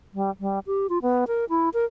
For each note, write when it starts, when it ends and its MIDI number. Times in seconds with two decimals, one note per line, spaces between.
0.14 0.30 55
0.40 0.59 55
0.67 0.87 67
0.89 0.98 65
1.02 1.25 59
1.28 1.45 70
1.50 1.69 64
1.74 1.85 70